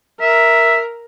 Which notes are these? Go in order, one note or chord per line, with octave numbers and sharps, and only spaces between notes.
A#4 E5